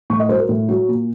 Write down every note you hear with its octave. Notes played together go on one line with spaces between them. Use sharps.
A2 C#6
D#5
F#3 C5
A#4
A2
F#3
A#2